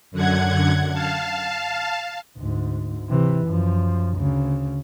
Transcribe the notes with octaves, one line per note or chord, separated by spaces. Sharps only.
F#2 D3 F#5 G#6
F5 A5
D2 G#2
C3 E3
F#2 F3
D2 C#3